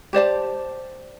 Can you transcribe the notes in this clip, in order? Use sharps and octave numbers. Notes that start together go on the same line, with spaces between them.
G4 C5 D5 A5